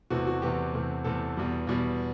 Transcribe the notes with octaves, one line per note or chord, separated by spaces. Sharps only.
E2 C3 E3 A3 F#4
F#4
E2 C3 E3 A3 G4
E2 C3 E3 A3
E2 C3 E3 A3 A4
E2 B2 G3
E2 B2 G3